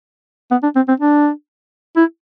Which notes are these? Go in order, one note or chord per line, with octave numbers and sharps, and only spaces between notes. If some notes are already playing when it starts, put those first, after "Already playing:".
B3
D4
C4
C4
D4
E4